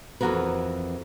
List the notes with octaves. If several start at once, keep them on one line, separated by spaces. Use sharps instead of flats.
F2 E3 C#4 F#4 A#4 B4